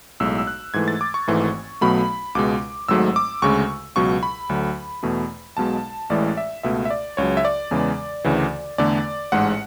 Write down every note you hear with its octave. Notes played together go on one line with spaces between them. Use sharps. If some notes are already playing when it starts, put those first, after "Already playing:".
B1 A2 G#3 E6
E6
F#6
G#2 E3 A3 G#6
A6
D6
C#6
G#1 G#2 E3 A3
B1 B2 F#3 A3 B5
C#2 B2 G#3 D6
G#1 G#2 F#3 A3 E6
D6
D2 C#3 G#3 C#6
C#2 B2 F#3 C#6
B5
D2 D3 F#3
E2 B2 A3
B1 B2 G#3 A5
A1 A2 E3 G#3 D5
E5
C#2 B2 A3 E5
E5
D5
C#2 C#3 F#3 C#5
E5
D5
E2 C#3 E3 G#3
D2 C#3 E3
E2 D3 A3 D5
A1 G#2 G#3 F#5